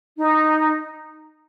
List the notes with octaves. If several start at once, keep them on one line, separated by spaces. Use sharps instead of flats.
D#4